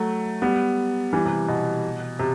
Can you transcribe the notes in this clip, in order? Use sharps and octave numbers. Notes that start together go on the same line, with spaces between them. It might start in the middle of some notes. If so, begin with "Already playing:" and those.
Already playing: F#3 A3
G3 B3
E3 G3
C3
B2
C3